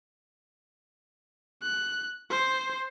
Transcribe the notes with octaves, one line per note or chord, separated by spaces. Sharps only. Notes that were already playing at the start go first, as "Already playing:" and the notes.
F#6
C5